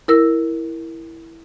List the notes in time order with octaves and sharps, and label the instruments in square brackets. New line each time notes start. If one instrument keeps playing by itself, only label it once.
[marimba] E4 A#4 E6